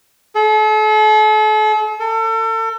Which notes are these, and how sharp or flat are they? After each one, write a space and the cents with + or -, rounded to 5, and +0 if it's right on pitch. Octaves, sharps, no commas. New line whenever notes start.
A4 -40
A4 +35